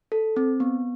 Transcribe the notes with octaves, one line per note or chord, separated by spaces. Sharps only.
A4
C4
B3